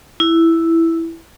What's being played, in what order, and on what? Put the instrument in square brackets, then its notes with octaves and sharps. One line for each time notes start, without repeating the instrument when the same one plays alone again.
[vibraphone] E4